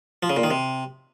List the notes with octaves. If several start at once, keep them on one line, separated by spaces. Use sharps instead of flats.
F3
C#3
A#2
D#3
C3